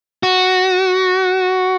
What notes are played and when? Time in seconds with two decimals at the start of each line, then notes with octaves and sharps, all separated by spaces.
0.23 F#4